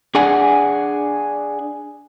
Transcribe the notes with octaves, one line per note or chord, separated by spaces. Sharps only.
D4 G#4 D5 F#5 G#5